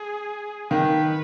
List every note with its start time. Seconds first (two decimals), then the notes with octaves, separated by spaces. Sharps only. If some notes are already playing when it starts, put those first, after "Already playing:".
Already playing: G#4
0.71 D#3 B4